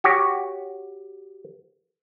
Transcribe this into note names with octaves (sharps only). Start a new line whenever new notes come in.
F#4 G4 C#5